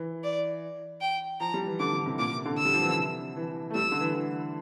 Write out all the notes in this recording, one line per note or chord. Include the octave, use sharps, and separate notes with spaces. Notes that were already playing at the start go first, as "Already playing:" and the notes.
Already playing: E3
D5
G5
F3 A#5
G3
E3
D3 D6
D3
C3
A#2 D6
C3
D3
E6
G3
F3
E3
D3
C3
E3
A3
G3 E6
D3
E3
E3